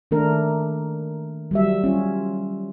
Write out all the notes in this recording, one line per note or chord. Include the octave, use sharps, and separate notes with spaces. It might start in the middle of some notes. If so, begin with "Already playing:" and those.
D#3 A3 D4 A#4
F#3 G3 E5
C#4 F4